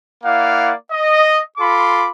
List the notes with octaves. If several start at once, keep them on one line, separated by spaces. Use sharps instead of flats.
A#3 E4 D5 F5 F#5
D#5
F4 A4 B5 C6 D6